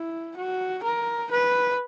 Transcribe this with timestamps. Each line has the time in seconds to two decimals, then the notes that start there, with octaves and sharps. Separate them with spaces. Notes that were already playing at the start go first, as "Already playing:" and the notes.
Already playing: E4
0.37 F#4
0.83 A#4
1.31 B4